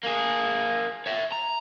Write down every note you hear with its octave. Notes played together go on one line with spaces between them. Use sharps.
A#3 G#4
C#5 E5
A#5